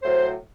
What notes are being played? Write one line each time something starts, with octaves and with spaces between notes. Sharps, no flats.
A2 F#3 C5